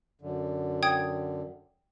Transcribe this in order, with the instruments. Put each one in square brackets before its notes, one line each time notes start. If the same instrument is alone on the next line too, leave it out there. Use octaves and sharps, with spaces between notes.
[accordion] F#2 D3
[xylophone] G5 D#6 G#6